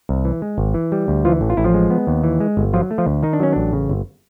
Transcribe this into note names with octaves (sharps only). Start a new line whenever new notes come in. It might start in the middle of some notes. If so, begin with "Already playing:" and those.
C2
E3
G#3
G#1
E3
G3
D2
E3 F3 F4
A1
F4
A1 E4
F3 F4
G#3
B3
D#2
E3
G#3
G1
F3 F#3 F4
A3
F3 F4
D2
D#3 D#4
D4
F#3 C#4
A1 D4
C#3
G1